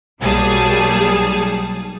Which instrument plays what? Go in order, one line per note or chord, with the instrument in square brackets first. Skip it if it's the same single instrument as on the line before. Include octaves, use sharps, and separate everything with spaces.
[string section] B1 F#3 G3 A#3 G#4 A5